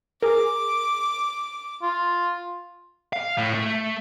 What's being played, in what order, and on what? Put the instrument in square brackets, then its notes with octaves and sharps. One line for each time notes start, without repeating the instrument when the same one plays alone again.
[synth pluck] G#4 A#4 [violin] D6
[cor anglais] F4
[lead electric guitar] F5
A2
A3